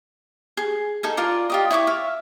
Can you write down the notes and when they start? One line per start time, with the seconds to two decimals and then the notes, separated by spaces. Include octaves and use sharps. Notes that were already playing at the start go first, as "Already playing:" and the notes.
0.57 G#4
1.03 D#4 A4 G#5
1.17 F4 A#4 D5
1.50 F4 G4 D#5
1.71 E4 C#5 C#6 D6
1.87 E5 F5